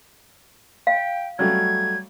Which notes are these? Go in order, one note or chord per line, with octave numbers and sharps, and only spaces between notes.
F5 G5
F#3 G3 A3 G#6